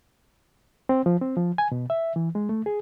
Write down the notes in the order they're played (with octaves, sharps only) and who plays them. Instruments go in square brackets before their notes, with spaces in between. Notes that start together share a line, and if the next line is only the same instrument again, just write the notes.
[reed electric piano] C4
F3
C4
F3
G#5
B2
E5
E3
G#3
A3
G#4